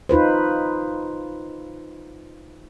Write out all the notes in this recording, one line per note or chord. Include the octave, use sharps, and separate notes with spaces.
D#4 F4 B4 C5